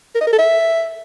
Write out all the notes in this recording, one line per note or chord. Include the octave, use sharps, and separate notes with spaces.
A#4
D#5
A#4
A4
E5